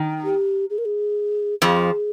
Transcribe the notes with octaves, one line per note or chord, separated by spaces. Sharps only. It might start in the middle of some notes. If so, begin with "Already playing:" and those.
Already playing: D#3
G4
G#4
A#4
G#4
F2 F3 G#4